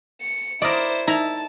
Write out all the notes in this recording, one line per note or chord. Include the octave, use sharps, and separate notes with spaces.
C#7
E4 A#4 C5 D5 D#5
D#4 E4 A5 A#5